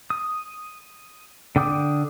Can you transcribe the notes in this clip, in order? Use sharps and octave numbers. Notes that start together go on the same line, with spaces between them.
D#6
D3 G5 D6 D#6